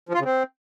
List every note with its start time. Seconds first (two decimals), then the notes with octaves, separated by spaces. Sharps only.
0.09 F3
0.14 F4
0.20 C#3
0.25 C4